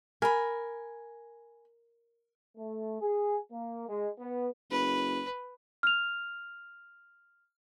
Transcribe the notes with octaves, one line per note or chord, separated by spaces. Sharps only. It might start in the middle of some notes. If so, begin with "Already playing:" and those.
A#4 G#5 B5
A3
G#4
A#3
G#3
B3
F#1 B4
F6 F7